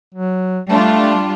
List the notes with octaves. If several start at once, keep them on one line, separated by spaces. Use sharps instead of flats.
F#3
G3 A3 D4 F4